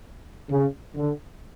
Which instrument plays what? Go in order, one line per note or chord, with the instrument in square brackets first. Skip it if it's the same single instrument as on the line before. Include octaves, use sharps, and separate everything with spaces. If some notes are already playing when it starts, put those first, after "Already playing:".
[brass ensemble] C#3
D3